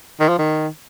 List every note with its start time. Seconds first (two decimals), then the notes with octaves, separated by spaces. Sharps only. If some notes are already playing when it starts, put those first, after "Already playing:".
0.20 D#3
0.28 F3
0.38 D#3